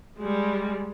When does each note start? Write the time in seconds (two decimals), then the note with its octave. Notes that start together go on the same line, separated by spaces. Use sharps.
0.18 G3 G#3